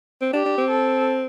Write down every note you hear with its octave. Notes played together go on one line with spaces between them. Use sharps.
C4
D4 G4
D4
C4
A4